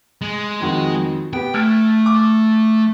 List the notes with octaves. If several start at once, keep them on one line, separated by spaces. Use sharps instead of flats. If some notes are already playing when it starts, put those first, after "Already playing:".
G#3
F2 D#3 F#4
B3 G4 G5
A3 F6 G#6 D7
D6